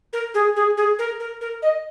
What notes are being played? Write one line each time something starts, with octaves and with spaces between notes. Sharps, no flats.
A#4
G#4
G#4
G#4
A#4
A#4
A#4
D#5